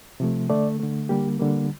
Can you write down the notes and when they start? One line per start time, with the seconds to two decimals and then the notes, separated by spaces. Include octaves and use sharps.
0.20 C3 F3 A3
0.49 D3 A3 D5
0.80 D3 A3
1.09 D3 G3 A#3 G4
1.39 D3 G3 A#3